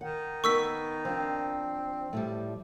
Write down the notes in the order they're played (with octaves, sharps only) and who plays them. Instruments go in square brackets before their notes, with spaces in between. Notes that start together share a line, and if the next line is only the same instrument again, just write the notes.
[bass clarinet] D#3 [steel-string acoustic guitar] F#5
[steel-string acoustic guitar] B3 D#4 A#4 [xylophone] C#6 E6 B6
[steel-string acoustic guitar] F3 D4 [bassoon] C4
[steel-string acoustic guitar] A2 F3 G3